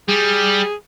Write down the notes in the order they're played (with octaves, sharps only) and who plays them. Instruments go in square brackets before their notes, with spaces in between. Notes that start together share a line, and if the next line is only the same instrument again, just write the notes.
[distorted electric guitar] G3 [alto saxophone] G#4